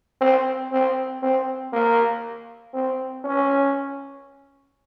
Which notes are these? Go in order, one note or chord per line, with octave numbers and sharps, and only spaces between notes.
C4
C4
C4
A#3
C4
C#4